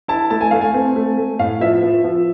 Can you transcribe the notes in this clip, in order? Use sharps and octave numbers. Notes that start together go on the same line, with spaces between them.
E4 A5
A3 A5
G#5
A3 F5
G#5
C4
A3
A3
A2 F5
F3 E5
F3
F3